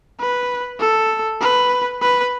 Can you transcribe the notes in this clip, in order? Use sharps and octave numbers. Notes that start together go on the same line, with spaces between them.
B4
A4
B4
B4